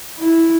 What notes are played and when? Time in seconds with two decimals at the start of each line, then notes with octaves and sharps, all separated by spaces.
0.18 E4